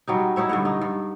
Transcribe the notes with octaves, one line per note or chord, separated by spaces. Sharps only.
F#3 G3 D#4
D#4 E4 C#5 E5
G2 D3 F#5
D#4
G2